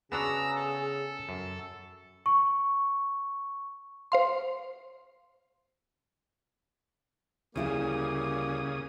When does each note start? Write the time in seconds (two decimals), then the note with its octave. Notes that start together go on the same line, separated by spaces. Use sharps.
0.12 C#3 B3 D4 F#4 G#4 A#5 E6
0.55 A4
1.29 F#2
2.26 C#6
4.12 C5 F5 C6
7.56 D2 C#3 G3 A#3 E4 G#4 D#6